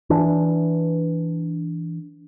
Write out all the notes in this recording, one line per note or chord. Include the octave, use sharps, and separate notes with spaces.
E3 D4